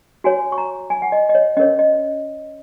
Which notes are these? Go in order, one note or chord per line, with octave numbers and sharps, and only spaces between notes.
F#4 C#5 G#5
C#6
A#5
G#5
F#5
D#5
D#5
C#5
C#4 A#4 C#5 D#5
D#5